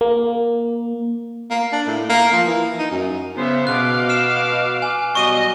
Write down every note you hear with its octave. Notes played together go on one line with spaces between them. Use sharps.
A#3
A#3
D4
A2
A#3
F3
E3
D#4
F#2
C#3 B3 C5 E5
B2 F5 D6 F#6
F6 C7 E7
G#5
B2 F#3 G3 D#5 C#6 D#7 G7